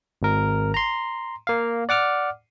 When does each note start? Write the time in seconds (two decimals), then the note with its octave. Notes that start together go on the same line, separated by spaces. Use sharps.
0.22 G#1 A#4
0.74 A#5 C6
1.47 A#3 F5
1.89 D5 F#5 D6 F6